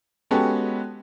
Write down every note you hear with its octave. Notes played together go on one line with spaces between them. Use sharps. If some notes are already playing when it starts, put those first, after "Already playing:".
G#3 B3 C#4 F#4 G4 A4